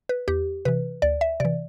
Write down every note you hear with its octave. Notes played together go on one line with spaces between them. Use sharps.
B4
E2 G4
C3 E3 B4
D2 D5
E5
C3 E3 D5